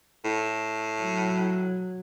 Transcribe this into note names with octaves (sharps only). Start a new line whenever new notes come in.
A2
F#3